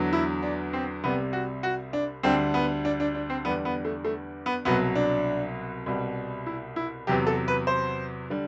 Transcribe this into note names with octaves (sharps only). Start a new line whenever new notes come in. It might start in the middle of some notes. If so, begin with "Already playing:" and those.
Already playing: E2 D3 F#3
E4
D4
C4
C2 C3 G3 B3
F#4
F#4
D4
D2 D3 G3 C4
B3
D4
D4
D4
C4
E2 D3 G3 B3
B3
A3
A3
B3
C2 B2 F#3 B3
D4
C2 B2 G3
E4
E4
E2 C3 F#3 G4
A4
B4
C5
D3 G3